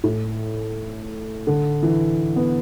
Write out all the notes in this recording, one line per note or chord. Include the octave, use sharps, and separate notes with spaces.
A2
D3
E3
B3